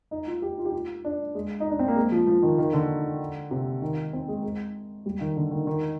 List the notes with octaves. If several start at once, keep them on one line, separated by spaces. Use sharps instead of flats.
D#4
F4
G4
F4
G4
F4
D4
G#3
D#4
D4
C4
A#3
G#3
F3
F3
D#3
D#3
D3
C3
D#3
C4
G#3
G#3
G3
D#3
D3
D#3
D#3